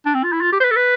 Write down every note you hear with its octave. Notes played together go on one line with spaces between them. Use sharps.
D4
C4
F4
E4
F4
G4
C5
B4
A4
B4